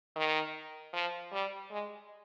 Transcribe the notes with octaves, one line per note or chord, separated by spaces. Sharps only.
D#3
F3
G3
G#3